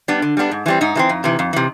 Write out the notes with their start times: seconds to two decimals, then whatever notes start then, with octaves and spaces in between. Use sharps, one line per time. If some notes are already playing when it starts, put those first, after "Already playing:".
0.08 G3 B3 D4
0.22 D3
0.37 G3 B3 D4
0.51 G#2
0.66 E3 G3 C4
0.81 G#2 D#4
0.95 E3 G3 C4
1.09 F2
1.24 C3 E3
1.39 F2
1.53 C3 E3